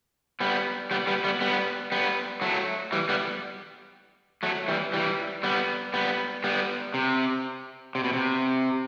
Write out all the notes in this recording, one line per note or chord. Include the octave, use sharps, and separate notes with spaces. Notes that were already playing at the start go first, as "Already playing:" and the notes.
G3 B3
G3 B3
G3 B3
G3 B3
G3 B3
G3 B3
F#3 A3
E3 G3
G3 B3
F#3 A3
E3 G3
E3 G3
G3 B3
G3 B3
G3 B3
C3
C3
B2
C3